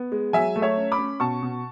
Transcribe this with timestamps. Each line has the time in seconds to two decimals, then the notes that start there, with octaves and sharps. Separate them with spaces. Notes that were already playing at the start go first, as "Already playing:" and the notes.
Already playing: B3
0.12 G#3
0.33 F#3 E5 G#5
0.56 A3
0.62 C#5 E5
0.77 C#4
0.92 B5 D6
0.98 C#4
1.20 B2 A5 C#6
1.43 B2